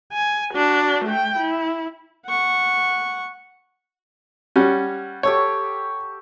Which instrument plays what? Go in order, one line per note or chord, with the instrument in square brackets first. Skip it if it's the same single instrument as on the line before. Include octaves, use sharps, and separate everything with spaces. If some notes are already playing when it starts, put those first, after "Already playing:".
[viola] G#5
D4 F#4
A3 G5
E4
[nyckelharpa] F#5 C#6
[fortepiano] G3 C#4 [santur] F#5
[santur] G4 A4 C#6 [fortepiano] C#5